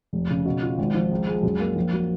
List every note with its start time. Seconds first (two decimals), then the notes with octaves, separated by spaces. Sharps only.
0.13 F1
0.30 C#3
0.46 B2
0.62 F4
0.78 G#1
0.94 F3
1.12 C#2
1.27 G#3
1.43 F#2
1.60 A#3
1.76 A#1
1.93 F#3